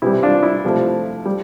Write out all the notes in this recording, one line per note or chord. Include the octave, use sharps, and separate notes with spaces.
C3 E3 G3 E4
D4 F4
E4
C3 F3 A3
G3